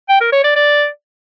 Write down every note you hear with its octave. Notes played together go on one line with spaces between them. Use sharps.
G5
A#4
C#5
D5
D5